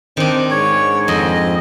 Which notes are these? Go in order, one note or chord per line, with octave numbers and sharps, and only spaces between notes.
D#3 C4 D4
G#2 C#5
F2 D#5